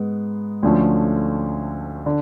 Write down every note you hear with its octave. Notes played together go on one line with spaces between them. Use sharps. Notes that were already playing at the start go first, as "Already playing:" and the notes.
Already playing: G#2 G#3 B3
D2 D3 F3 A3 C#4
D3